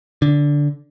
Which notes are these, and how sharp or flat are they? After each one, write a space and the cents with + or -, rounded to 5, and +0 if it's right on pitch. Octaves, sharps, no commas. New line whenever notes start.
D3 -10